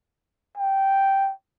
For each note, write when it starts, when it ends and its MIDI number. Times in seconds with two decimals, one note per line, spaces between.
0.57 1.32 79